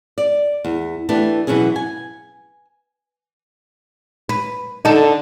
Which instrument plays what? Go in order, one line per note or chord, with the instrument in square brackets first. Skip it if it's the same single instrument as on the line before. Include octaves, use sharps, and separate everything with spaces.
[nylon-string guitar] D5
E2
E3 A3 B3 D4 G4
B2 E3 F#3 C#4 G#4
G#5
[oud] B4
[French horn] D3 [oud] D#4 A4